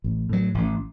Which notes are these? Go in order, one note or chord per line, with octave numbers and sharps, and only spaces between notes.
A1
A2 F#3
A1